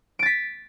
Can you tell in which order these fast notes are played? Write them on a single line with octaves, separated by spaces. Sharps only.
D7 A6 B6